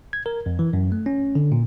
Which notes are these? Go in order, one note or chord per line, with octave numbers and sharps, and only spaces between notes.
G#6
A#4
F2
E3
F#2
A3
C#4
D3
A#2